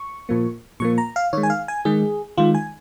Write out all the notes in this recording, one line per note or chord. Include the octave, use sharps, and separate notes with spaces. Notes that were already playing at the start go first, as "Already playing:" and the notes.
Already playing: C#6
A#2 F3 A#3
A#2 F3 A#3 C#6
A#5
F5
D#3 G#3 C#5
G#5
F5
G#5
D#3 G#3 G#4
D#3 G#3 F4
G#5